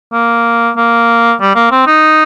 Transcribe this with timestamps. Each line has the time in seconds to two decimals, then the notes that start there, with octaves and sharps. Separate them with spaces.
0.13 A#3
0.77 A#3
1.40 G3
1.55 A#3
1.71 C4
1.87 D#4